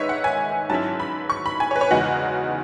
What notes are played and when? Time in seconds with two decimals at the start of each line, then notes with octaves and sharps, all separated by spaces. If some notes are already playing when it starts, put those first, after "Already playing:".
Already playing: G#2 D#3 G#3 D#4 B4 C#5 E5
0.09 F#5
0.24 G#5
0.69 G#2 F#3 C#4 E4 A5
1.00 B5
1.30 C#6
1.46 B5
1.60 G#5
1.71 C#5
1.76 B4
1.81 C#5
1.91 E2 C#3 G#3 D#4 F#4